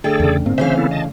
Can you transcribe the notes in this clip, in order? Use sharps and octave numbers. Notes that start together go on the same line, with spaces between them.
D3 A3 D4 G#4 A4 D5 G5
E2 C#3
G#2 A#3 C4
C#3 E3 C5 E5 F5
B3 E4 A4
D#5 A5